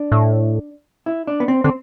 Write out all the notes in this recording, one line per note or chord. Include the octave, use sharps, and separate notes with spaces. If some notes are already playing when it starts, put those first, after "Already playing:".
Already playing: D4
A2
E4
D4
B3
C4
D3 C4